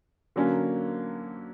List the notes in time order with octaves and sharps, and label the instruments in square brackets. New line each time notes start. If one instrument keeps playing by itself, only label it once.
[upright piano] D3 F#3 A#3 C#4